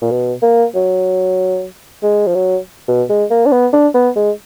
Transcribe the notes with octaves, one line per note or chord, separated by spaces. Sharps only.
A#2
B2
A#3
F#3
G#3
F3
F#3
B2
G#3
A#3
D4
B3
D4
B3
G#3